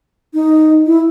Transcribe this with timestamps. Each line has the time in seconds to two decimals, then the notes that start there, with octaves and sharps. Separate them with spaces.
0.34 D#4
0.87 E4